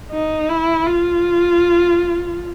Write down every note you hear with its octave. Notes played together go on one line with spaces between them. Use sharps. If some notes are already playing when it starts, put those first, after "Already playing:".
D#4
E4
F4